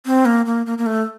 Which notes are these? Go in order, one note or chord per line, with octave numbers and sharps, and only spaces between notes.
C4
A#3
A#3
A#3
A#3
A3